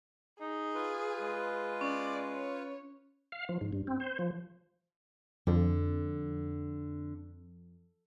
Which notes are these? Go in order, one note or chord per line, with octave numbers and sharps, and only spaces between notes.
D#4 G#4
F4 B4
G#3
C#4 D5
C#5
F5
F3
G#2
G2
C4
C5
F3
F2 D3